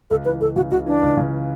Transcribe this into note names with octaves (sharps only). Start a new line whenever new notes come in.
C#2 A4
E3 B4
C#2 A4
C#3 F#4
C#2 F#4
E3 D4
C#2
C#3